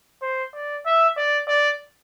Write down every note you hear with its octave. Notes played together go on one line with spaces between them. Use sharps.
C5
D5
E5
D5
D5